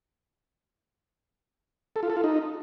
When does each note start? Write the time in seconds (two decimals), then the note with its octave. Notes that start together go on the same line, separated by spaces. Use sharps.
1.96 A4
2.03 F4
2.10 A4
2.17 F4
2.24 D#4